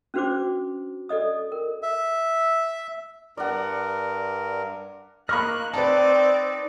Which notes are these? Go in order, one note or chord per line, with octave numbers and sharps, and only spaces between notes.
C#4 D4 F#4 B4 C5 D6
A4 D5 D#5 D#6
A#4
E5
G2 A#4 D5 F#5
A#3 D#5 B5 C#6 D6 F6 F#6
C4 D#4 B4 D5 A5